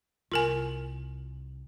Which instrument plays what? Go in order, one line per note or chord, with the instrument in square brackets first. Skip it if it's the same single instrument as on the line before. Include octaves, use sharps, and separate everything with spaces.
[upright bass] C2 [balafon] F4 A#4 G#5